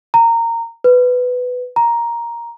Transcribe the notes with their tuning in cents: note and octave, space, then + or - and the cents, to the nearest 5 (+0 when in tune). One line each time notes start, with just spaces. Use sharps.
A#5 -15
B4 +10
A#5 +5